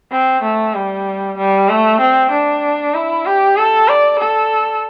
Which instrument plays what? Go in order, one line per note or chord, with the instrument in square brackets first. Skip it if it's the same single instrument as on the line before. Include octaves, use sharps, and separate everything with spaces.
[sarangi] C4
A3
G3
G3
A3
C4
D4
E4
G4
A4
D5
A4